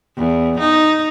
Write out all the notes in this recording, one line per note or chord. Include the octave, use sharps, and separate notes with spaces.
E2
D#4